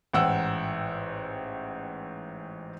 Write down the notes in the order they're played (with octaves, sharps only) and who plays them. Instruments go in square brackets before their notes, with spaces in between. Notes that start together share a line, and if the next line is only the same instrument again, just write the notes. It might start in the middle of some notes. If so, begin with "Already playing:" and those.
[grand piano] A1 G#2 F#5 G5 E6